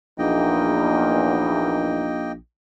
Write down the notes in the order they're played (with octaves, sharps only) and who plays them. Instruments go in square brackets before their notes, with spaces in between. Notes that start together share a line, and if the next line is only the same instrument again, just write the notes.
[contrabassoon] A#1 [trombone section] E2 [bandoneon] A#3 D#5 G5 [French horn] D#4